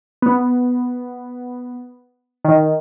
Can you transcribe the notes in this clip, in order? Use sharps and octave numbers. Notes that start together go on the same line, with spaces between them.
B3
D#3